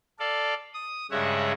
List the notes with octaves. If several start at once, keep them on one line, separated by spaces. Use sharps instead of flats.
A4 D5 F5
D#6
G2 C#3 G#3 C#5 E5 F#5